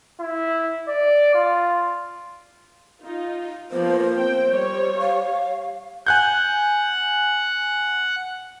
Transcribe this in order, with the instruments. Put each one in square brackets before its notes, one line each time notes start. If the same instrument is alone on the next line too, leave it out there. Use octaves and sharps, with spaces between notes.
[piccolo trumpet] E4
D5
F4
[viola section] D#4 F4
[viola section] F3 A#3 B3 [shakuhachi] C5
[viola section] C4 G5
G3 C#5
[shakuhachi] F5
[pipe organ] F#5 [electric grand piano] G#5 F#6 G6